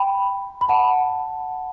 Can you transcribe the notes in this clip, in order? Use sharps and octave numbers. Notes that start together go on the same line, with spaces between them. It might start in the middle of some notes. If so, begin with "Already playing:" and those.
Already playing: G5 B5
B5
F#5 A5